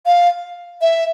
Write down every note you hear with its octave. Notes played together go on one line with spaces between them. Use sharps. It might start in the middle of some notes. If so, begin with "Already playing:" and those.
F5
E5